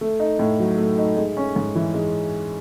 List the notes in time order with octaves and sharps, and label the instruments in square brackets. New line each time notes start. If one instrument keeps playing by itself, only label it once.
[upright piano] A3
D#4
A2
F#3
A3
D#4
G#3
C#4
G#2
E3
G#3